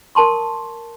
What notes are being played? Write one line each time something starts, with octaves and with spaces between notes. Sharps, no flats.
A#4 A5 C6 C#6